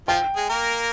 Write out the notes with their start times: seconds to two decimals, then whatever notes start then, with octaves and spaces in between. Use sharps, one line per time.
0.08 F3 F4 G5
0.36 G#3 G#4
0.49 A#3 A#4